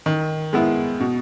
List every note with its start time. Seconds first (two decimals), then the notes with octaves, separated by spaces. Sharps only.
0.06 D#3
0.53 G#3 B3 E4
1.00 B2